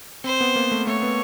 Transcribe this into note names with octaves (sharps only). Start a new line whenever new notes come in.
C4 C5
B3
A#3
A3
A3 C#5
B3